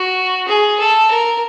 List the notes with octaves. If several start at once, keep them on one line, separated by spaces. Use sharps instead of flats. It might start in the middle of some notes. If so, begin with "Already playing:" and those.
Already playing: F#4
G#4
A4
A#4